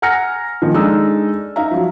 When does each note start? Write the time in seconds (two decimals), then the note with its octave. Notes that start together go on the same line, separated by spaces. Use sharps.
0.02 F#5 G#5 A#5 F6 A#6 C#7
0.62 A#2 D#3 F3
0.74 G#3 D4 D#4 A4 E6
1.56 D#4 E5 F5 A#5
1.71 F3 F#3